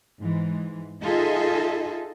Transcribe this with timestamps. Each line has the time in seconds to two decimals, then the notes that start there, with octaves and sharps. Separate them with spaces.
0.19 G#2 E3 G#3
1.02 D#4 F4 G#4 A4 D#5 E5